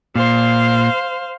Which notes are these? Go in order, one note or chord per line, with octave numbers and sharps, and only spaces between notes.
A#2 C5 F5